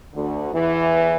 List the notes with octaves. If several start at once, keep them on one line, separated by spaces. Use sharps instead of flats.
D2 D3
E2 E3